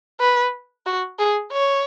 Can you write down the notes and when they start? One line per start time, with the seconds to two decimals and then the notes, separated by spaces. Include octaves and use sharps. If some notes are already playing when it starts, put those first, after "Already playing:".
0.20 B4
0.86 F#4
1.19 G#4
1.52 C#5